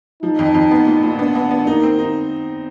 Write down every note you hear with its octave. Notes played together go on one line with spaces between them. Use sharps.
F3 D#4
F2
F2
B3
A#2
A#2
B3 D4
B3
B3
A#3 D#4
C4
D#4